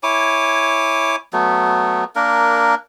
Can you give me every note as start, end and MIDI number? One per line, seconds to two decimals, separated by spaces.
0.03 1.16 64
0.03 1.16 73
0.03 1.16 80
0.03 1.16 86
1.33 2.04 54
1.33 2.04 57
1.33 2.04 59
2.16 2.75 58
2.16 2.75 62
2.16 2.75 70